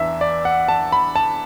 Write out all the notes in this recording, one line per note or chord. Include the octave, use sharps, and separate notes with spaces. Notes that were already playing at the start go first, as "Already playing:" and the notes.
Already playing: E2 E3 D4 E5
D5
F#5
A5
B5
A5